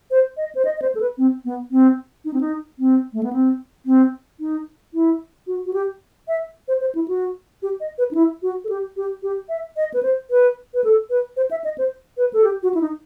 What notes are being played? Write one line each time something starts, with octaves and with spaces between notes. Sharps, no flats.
C5
D#5
C5
D#5
D#5
C5
A4
B4
C4
B3
C4
D#4
C4
D#4
C4
A3
B3
C4
C4
D#4
E4
F#4
F#4
G4
E5
C5
C5
E4
F#4
G4
D#5
B4
D#4
E4
F#4
A4
G4
G4
G4
E5
D#5
B4
C5
B4
B4
A4
B4
C5
E5
D#5
C5
B4
A4
G4
F#4
E4
D#4